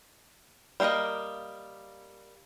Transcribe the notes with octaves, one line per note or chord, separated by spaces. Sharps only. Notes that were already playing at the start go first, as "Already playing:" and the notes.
G3 A#3 E4 A#4 D#5